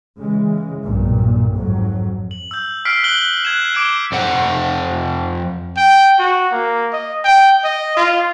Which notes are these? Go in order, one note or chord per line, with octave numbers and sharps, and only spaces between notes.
C#3 E3 G#3
B1 G2 A#2
G#1 F2 G#2 F#3
F#7
E6 G6
E6 F6 B6 C7 D7
F#6 F#7 G7
F#6 G#6 E7
D6 G#6 D7 E7 G7
F2 C5 F#5
G5
F#4
A#3
D#5
G5
D#5
F4